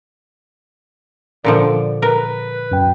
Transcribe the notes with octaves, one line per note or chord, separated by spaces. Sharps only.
A#2 D3 F3 D5
A#4 B4
F#2 G5